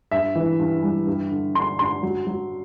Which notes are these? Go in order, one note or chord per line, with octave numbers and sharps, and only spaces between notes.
G2 E5
E3
G2
G3
G2
D3
D3 C6
G2 C6
F#3
F#3